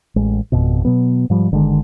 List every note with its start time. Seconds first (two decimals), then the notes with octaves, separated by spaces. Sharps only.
0.16 A1 G#3
0.52 G#1 F2 B2
0.85 B2 F#3 B3
1.30 G#2 F3 G3
1.51 G1 D3 D#3 G#3